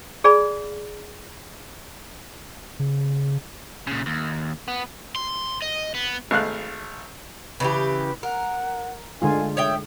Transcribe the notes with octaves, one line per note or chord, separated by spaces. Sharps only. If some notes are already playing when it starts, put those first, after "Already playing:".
G#4 D5 G#5 B5
C#3
A#2 C#3
D#2
B3
C6
D#5
B3
G#1 A3 F5 F#6
C#3 E3 G4 B4
A#4 F#5
D3 G#3 F4 G#5
C#5 E5 G5 D#6